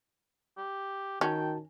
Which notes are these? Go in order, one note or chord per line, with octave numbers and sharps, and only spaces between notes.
G4
D#3 C#4 F#4 G5 A5